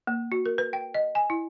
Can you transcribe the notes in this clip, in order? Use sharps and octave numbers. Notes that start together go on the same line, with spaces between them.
A#3
F#4
A#4
B4
G5
D#5
G#5
E4